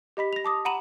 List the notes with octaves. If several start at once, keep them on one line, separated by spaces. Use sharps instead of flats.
G4 D#5 B5 B6
A#6 F7
A5 D6 D#6
F#5 A#5 B5 D#7 E7 F#7